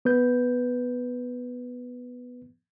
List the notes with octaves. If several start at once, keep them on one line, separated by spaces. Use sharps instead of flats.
B3 B4 G6